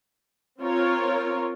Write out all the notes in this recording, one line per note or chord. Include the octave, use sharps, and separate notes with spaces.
C4 F4 A#4 C#5